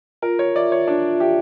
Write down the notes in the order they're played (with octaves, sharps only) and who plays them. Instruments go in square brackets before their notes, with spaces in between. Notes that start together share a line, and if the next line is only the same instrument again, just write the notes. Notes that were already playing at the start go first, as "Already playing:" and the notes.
[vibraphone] F4 [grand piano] A#4
[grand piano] C#5
[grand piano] D5 [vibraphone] E5
[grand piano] C#5
[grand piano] D4 [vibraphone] F4
[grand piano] G4 [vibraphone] E5